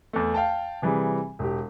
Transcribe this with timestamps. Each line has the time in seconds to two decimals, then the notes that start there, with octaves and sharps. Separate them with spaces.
0.13 E2 A3
0.34 F5 G5 A5
0.82 C3 E3 G3 G#4
1.39 E1 G4